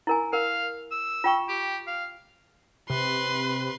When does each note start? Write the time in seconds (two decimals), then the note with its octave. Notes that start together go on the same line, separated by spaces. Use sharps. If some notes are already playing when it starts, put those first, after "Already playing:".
0.07 E4 A#4 G#5
0.33 A#4 F5
0.92 E6
1.24 F4 G5 C#6
1.49 G4
1.87 F5
2.90 C3 B4 C6